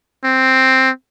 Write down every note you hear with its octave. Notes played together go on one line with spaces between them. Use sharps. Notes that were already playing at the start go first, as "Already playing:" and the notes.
C4